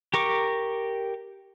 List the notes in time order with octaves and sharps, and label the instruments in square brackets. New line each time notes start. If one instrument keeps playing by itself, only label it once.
[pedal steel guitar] G4 A#4 C#6 D6